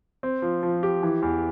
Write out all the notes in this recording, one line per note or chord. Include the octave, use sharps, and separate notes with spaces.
C4
F3
F3
G4
E3
E2